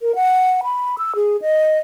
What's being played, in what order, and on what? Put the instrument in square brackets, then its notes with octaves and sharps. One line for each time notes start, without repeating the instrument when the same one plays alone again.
[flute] A#4
F#5
B5
E6
G#4
D#5